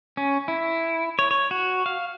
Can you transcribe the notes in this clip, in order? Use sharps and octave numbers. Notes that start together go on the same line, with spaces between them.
C#4
E4
C#5
C#5
F#4
F5